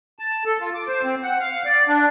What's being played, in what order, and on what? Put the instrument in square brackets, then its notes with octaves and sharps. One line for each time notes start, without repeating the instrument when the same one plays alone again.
[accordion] A5
A4
F4
D6
C5
C4
F#5
F5
D5
D4